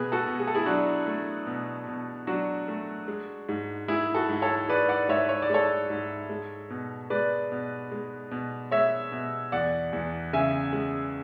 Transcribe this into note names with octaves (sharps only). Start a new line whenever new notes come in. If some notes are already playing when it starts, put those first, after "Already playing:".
Already playing: B2 G#4 B4
F#4 A4
B2
G#4
A4
E4 G#4
F#3 D4 F#4
A3
B2
B2
F#3 D4 F#4
A3
G#3
G#2
G#3 E4 G#4
F#4 A4
G#2
A4 C#5
G#3 B4 D5
D5 F#5
G#2 C#5 E5
C#5
D5
G#3 A4 C#5
G#2
G#3
B2
G#3 B4 D5
B2
G#3
B2
G#3 C#5 E5
B2
E2 D5 F#5
E2
C#3 E5 G#5
G#3